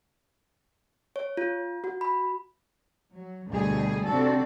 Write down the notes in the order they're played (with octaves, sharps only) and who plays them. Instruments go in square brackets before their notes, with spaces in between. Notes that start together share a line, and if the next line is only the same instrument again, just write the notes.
[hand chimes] C#5
F4
F#4
B5
[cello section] F#3
D2 B2 G3 G#4
C3 C4 D4 F#4 A4